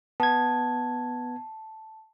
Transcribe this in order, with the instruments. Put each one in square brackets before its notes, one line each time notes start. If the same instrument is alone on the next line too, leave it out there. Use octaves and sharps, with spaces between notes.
[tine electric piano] B3 G#6 [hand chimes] A5